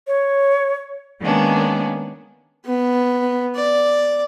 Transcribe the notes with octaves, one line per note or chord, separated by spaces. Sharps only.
C#5
D#3 G#3 A#3 B3 C#4 D4
B3
D5